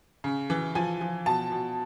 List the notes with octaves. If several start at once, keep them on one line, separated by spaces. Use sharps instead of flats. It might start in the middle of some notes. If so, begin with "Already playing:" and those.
C#3
E3
F3 G#5
F3
B2 A5
B2